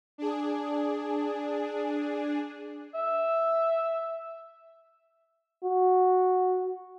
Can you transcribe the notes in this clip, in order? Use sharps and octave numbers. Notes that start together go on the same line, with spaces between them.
D4 G#4
E5
F#4